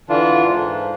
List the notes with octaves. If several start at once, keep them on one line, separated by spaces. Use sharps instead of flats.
D3 E3 D4 F4
G#2